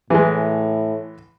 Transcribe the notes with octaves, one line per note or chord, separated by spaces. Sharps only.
A2 E3 G#3